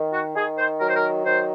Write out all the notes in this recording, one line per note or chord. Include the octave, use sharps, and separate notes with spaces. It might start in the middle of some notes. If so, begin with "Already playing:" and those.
Already playing: D#3
F#4
D#3 G#4
C5
F#3 A#4
C5
A#4
D#3 C5